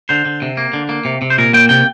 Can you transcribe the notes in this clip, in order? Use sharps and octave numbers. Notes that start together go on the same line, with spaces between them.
D3 C5
D3
C3
A#3
D3
A#3
C3
C3
C5
A#2 A#4
A#3 G5
C3 G5